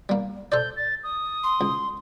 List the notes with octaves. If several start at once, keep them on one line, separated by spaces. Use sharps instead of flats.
G3 A#3
A4 C5 D5 G6
A6
D#6
C6
C#2